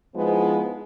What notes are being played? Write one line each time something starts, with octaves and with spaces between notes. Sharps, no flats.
F3 G#3 B3 D#4 E4 C5